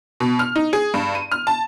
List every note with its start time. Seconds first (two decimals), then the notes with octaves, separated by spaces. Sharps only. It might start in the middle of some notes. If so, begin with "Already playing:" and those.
0.20 B2
0.39 F6
0.56 D#4
0.73 G#4
0.94 G2
1.15 D#7
1.32 F6
1.47 A5